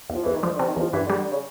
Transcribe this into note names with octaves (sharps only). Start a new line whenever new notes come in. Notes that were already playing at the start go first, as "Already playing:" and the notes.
E2
F3
E2 E3
D#3
D3 F3
D3
C3
D#3
E2 F3
G2 E3
D3
G3
D3
C#3